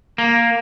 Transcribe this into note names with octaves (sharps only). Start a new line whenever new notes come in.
A#3